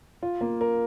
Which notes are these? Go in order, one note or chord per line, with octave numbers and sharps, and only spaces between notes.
F4
A#3
A#4